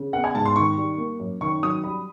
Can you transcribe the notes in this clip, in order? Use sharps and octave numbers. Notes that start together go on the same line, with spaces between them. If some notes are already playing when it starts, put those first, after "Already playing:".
Already playing: C#3
B3 F#5
G#5
G#2 A5
C6
D#3 C#6
G3
A#3
F#2
D#3 C#6
F#3 D#6
G3 B5